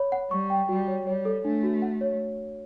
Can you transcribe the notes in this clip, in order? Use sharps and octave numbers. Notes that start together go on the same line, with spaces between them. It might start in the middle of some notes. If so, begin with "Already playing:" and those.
Already playing: C#5 B5
F#5
G3 C#6
G5
G3 F#4
C#5
G3 C#5
A4
A3 D4
F#4
F#5
C#5